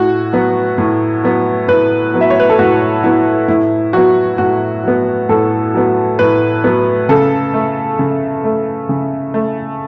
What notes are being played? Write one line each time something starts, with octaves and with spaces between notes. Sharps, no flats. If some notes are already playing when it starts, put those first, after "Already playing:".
Already playing: A2 F#4
F#3 B3
A2
F#3 B3
A2 B4
F#3 B3
E5
C#5
B4
A4
A2 F#4
F#3 B3 E4
A2 E4
F#3 B3 F#4
A2 F#4
F#3 B3
A2 A4
F#3 B3
A2 B4
F#3 B3
C#3 A4
A3
C#3
A3
C#3
A3